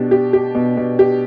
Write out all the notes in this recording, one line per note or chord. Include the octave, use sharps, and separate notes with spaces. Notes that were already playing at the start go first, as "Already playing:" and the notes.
Already playing: B2 D4 G4
G4
G4
B2
B2
G4